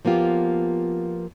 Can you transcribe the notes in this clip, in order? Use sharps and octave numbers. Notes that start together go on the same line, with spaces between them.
F3 A#3 B3 F4 G4